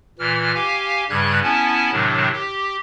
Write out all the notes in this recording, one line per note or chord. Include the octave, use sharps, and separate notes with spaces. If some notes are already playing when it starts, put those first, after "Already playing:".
A#2 E3 F6
G4 F5 G#5
G2 C#3 G3 F#6 G#6
B3 C#4 E4 G#5 A5
A2 C3 D#3 F#3 D4
G4